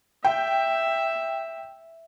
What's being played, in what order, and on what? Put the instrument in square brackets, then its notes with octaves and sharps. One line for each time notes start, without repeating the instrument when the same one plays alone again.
[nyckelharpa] E5 [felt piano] G5